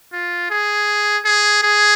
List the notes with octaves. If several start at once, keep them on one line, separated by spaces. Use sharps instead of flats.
F4
G#4
G#4
G#4